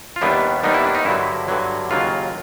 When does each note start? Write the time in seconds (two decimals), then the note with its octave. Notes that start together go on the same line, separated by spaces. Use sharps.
0.16 F4
0.21 D#2 D#3 G3 B3 D4 E4
0.63 D#2 D#3 G3 B3 D4 D#4
0.74 E4
0.84 D4
0.95 D#4
1.05 G2 D3 F#3 E4
1.48 G2 D3 F#3
1.90 D#2 C#3 F#3 A#3 F4